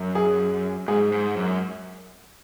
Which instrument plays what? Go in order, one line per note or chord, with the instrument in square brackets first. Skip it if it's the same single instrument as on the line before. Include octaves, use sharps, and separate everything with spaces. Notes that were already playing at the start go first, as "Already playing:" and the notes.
Already playing: [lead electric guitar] F#2
[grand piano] G#4
[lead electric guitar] G#2 [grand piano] G#4
[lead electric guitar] G#2
F#2